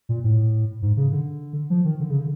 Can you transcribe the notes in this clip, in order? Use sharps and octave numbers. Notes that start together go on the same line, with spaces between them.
A#2
A2
G#2
C#3
D3
F3
D#3
D3
C#3
D3